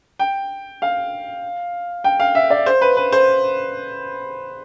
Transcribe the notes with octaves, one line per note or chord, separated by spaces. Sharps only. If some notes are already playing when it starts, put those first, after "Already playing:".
G5
F5
G5
F5
E5
D5
C5
B4
B4
C5